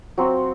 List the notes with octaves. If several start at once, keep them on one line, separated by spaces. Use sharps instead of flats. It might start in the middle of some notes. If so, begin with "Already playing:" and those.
F#3 C4 F#4